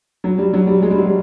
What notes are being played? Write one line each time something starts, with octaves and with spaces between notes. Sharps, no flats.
F#3
G3
F#3
G3
G#3
G3
F#3
G3